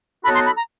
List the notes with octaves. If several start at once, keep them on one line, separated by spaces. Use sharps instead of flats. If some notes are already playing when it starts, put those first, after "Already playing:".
F#3 B3 D#4 F#4 A4 B5
C6
B5
A#5